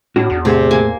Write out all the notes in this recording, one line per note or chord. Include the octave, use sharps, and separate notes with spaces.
A2 D4 F#4
E2
A2 C3 G#4 C5
A#3 G#5